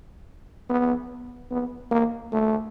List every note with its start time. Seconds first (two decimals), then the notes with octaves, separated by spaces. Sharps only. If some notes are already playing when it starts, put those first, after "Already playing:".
0.70 B3
1.51 B3
1.91 A#3
2.32 A3